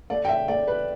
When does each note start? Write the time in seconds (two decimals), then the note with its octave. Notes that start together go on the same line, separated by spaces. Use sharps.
0.10 A3 D5
0.25 G5
0.29 E5
0.48 A3 D5
0.68 B4